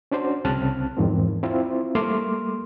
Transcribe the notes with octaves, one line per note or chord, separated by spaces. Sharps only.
C#4 D4 F#4 C5
C2 C#3 C4 A5 F6 F#6
E2 G#2 D#3 F3 C4
C4 E4 F4 C5
G3 A3 A#3 C6 D6 F6